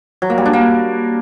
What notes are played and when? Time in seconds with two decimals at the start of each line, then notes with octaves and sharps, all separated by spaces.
0.22 F#3
0.30 A#3
0.38 G3
0.45 D4
0.53 A#3